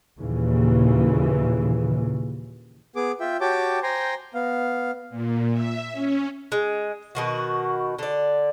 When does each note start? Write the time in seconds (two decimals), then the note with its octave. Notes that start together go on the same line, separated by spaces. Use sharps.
0.20 D#2 A#2 C#3 E3
2.96 B3 G#4 D6
3.20 F4 E5 G5
3.41 F#4 G4 C#5 G5 A5 D6
3.83 C5 G5 G#5 A#5 C6
4.34 B3 F5
5.10 A#2
5.53 E5
5.92 C#4
6.52 G#3
7.15 B2 D#3 F#4
7.99 D3 D5